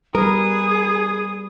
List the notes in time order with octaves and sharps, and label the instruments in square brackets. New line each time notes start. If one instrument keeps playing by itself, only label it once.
[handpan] G3 B4 [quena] G#4 [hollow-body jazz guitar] A#4 [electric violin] D#6